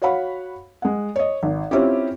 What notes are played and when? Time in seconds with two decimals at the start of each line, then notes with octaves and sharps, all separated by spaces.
0.02 F#4 C#5 F5 F#5 B5
0.82 G#3 F#5
1.16 C#5 D#5
1.43 G#1
1.71 C4 C#4 E4 F4 G4